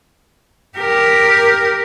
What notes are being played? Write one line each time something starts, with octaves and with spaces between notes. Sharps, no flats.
G4 A#4